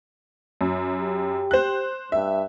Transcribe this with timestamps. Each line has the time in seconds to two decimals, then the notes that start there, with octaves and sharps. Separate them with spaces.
0.61 F#2
1.01 G4
1.51 C5 F#6
2.12 G2 E5